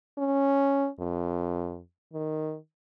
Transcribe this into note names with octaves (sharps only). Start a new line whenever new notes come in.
C#4
F2
D#3